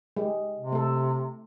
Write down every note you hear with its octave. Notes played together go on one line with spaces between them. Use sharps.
G#3 G4
C3
A3 A4